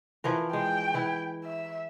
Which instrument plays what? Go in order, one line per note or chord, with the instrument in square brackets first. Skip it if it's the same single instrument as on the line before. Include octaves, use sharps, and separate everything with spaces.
[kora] E3 F3 A#4
[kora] G#3 [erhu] G5
[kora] E3 E4
[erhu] E5